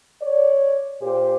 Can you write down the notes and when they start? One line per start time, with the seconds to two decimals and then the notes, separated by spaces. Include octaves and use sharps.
0.21 C#5 D5
1.01 A#2 G4 C5